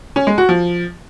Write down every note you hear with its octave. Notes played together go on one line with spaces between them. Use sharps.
C#4
G#3
F#4
F3